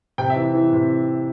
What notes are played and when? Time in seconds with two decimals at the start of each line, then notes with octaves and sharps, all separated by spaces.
0.18 C3 G5
0.30 E5
0.36 E3
0.54 E3
0.73 C3